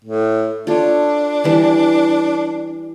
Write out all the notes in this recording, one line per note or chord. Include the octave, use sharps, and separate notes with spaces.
A2
D4 F4 A4 C#5
E3 G3 A5